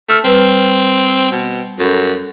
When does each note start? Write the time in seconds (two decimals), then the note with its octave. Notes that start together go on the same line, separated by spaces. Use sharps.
0.09 A3 A5 E6 F6
0.24 G3 C4 B4
1.32 B2
1.79 F#2 A4